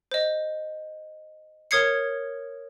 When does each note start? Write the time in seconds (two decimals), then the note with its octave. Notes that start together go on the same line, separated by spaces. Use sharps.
0.11 C5 D#5
1.71 A#4 C#5 D#6 G#6 C7 C#7